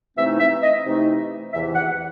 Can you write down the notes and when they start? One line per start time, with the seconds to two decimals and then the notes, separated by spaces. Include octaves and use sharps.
0.17 C3 E3 A3 C4 D#4 E5
0.40 E5
0.63 D#5
0.85 C3 E3 A3 C4 D#4
1.53 E2 C3 E3 E5
1.75 F#5